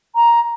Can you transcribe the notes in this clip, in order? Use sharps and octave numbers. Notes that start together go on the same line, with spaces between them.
A#5